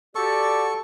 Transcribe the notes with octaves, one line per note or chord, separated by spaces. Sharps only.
F#4 G4 A4 D5 C#6